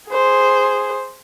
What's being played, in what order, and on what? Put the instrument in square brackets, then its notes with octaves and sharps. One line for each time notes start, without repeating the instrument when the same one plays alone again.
[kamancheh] G#4 C5